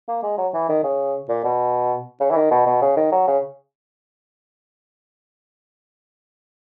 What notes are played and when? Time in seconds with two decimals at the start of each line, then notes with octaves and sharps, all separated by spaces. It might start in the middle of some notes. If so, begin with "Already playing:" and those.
0.08 A#3
0.23 G#3
0.38 F#3
0.54 E3
0.69 D#3
0.84 C#3
1.29 A#2
1.44 B2
2.20 C#3
2.31 E3
2.36 D#3
2.51 B2
2.66 B2
2.82 C#3
2.97 D#3
3.12 F#3
3.27 C#3